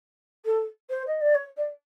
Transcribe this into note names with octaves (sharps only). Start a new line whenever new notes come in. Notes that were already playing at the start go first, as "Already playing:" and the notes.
A4
C5
D#5
D5
C#5
D5